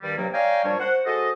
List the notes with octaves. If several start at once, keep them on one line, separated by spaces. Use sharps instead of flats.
G2 D#3 G3
G2 C3 F#3 A#3
C#5 D5 F5 G5 G#5 A#5
A#2 F3 G3 D4 C#5
C5 F#5
G#3 F#4 A4 C5 D#5